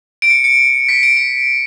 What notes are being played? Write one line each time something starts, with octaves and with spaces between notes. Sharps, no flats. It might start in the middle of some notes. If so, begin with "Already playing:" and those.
D7
C#7
C#7
B6
D7
D7